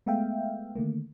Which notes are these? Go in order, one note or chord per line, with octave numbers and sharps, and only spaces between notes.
G#3 A3 B3 E5 F5 G5
D3 D#3 A3 A#3